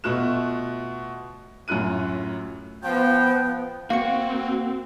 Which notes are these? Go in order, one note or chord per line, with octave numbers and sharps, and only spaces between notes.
B2 A3 F4 F#6 E7
F#2 A2 F4 F#6 D#7
F3 B3 G5
A#3 C4 F#4 F5 C#6 C#7